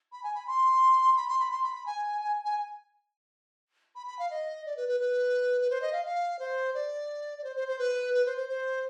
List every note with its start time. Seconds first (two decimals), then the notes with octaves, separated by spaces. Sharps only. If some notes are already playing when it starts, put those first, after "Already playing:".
0.12 B5
0.23 G#5
0.35 B5
0.47 C6
1.16 B5
1.28 C6
1.39 B5
1.51 C6
1.63 B5
1.75 B5
1.86 G#5
2.21 G#5
2.44 G#5
3.95 B5
4.06 B5
4.19 F5
4.30 D#5
4.65 D5
4.76 B4
4.88 B4
5.00 B4
5.61 B4
5.70 C5
5.81 D#5
5.92 F5
6.05 F5
6.39 C5
6.74 D5
7.38 D5
7.43 C5
7.55 C5
7.67 C5
7.78 B4
8.14 B4
8.25 C5
8.37 C5
8.49 C5